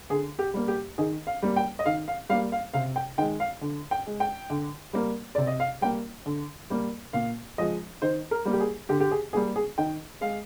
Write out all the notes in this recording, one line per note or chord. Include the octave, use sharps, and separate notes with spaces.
D3 G#4
G4
G3 A#3
G4
D#3 G#4
F5
G3 A#3
G5
D#5
D#3 F5
F5
G3 A#3 F5
F5
C3 F5
G5
D#3 G#3 G5
F5
D3
G5
G#3
G5
D3
G3 A#3
C3 D5
D#5
F5
G3 A#3 G5
D3
G3 A#3
A#2 F5
F3 G#3 D#5
D#3 C5
A#4
G3 A#3
G4
G#4
D3 G4
G4
G#4
G3 A#3 G#4
G#4
D#3 G5
G#3 F5